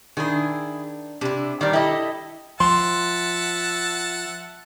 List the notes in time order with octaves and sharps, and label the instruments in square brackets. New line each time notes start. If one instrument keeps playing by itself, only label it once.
[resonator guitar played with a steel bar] D#3 D4 [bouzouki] E4 G#4
[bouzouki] C3 E4 [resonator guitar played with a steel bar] D4
[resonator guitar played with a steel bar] D#3 G3 [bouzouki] D4 A#4 D5
[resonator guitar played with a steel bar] E4 G4 [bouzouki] A4 D#5
[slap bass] F3 [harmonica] E5 F#5 A5 [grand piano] C6